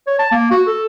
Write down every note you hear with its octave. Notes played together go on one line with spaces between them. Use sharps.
C#5
A5
A#3
F#4
A4